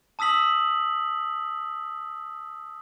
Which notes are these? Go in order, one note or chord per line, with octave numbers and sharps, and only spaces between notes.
A5 D#6 E6 B6 F#7